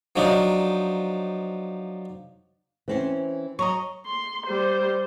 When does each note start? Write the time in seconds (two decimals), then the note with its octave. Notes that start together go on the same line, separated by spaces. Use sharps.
0.16 F3 F#3 D4 D#4
2.88 E3 C4 C#4
3.59 F#3 D#5 A#5 C#6
4.06 C6
4.46 G3 C5